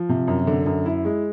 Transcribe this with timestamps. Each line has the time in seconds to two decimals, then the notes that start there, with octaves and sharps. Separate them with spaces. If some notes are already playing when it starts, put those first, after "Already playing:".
Already playing: F3
0.09 C3
0.28 F#2
0.47 D3
0.66 F#2
0.86 E4
1.05 G#3